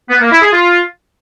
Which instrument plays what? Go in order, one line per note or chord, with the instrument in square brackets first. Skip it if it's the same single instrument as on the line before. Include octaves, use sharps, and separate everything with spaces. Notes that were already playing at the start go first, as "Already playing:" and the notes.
[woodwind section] B3
A#3
E4
G#4
F4